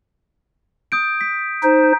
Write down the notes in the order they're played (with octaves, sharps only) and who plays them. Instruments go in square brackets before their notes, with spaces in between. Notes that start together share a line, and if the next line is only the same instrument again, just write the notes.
[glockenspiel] D#6 G6 D7
B6
[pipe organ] D#4 C5